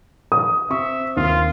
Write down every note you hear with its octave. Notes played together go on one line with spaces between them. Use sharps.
D#6
C4 E5 C#6
D#2 F4